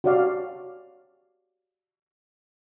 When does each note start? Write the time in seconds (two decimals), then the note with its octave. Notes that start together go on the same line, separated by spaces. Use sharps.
0.04 F#4 G4 C#5 D5 F5